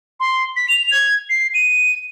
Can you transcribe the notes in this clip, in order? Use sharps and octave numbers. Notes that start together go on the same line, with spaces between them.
C6
B6
F7
G#6
C7
D#7